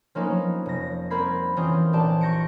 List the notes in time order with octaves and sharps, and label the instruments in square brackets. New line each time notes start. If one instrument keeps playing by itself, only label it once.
[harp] F3 F#3 A#3 B3 C#4 D#4
F1 A#6
G3 C4 A#4 B5 G#6 C7
E3 C4 C#4 F4 G5 D#6
A#1 G4 D5 A5
C#6 G6 A#6 C#7 D7